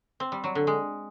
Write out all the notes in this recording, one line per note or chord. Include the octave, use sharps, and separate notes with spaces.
C4
G3
F#3
D3
G#3